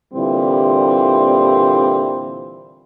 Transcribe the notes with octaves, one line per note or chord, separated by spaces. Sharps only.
A#2 D3 E3 G3 C4 E4